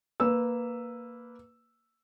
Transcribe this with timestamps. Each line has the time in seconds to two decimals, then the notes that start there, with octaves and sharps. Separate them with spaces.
0.20 A#3 B4 E6